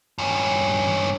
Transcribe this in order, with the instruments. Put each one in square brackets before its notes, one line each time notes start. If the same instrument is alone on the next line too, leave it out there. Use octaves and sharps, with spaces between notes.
[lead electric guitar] G2 C#4